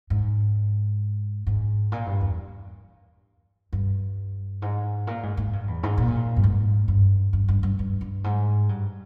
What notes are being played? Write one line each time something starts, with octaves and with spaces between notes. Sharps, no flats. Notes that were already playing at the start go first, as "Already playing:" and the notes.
G#2
G#2
A#2
G2
E2
G2
G#2
A#2
G#2
G#2
G2
E2
G#2
A#2
G2
G#2
G2
G2
G2
G2
G2
G2
G#2
G2